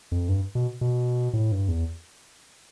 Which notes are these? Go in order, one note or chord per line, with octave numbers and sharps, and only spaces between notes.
F2
G2
B2
B2
A2
G2
E2